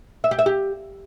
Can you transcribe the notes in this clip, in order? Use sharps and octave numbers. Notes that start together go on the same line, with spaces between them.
E5
G4
E5
G4